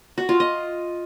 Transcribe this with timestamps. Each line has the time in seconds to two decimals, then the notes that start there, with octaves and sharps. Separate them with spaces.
0.18 F#4
0.29 F4
0.40 D#5